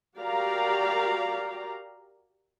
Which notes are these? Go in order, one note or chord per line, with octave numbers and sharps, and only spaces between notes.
F#4 G4 A#4 D5 F5 A#5